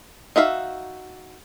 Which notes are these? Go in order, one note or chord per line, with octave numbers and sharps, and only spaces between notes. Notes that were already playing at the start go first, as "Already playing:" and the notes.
D#4 F#4 E5 F5